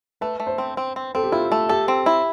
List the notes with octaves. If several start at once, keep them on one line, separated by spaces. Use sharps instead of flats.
A3 B4
A3
C5
C4
C4
C4
C4 A4
G4
E4 F4
A3
G4 A4
C4
E4